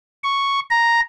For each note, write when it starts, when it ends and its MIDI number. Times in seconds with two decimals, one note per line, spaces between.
0.24 0.60 85
0.71 1.00 82